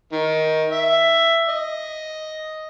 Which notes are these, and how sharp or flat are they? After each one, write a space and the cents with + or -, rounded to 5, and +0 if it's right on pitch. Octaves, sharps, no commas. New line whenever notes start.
D#3 +15
E5 +10
D#5 +5